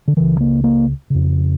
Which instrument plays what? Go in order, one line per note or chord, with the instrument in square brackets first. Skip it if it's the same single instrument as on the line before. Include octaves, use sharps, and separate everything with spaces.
[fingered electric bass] D3
C#2 C#3 E3
A#3
A#3
F2 C#3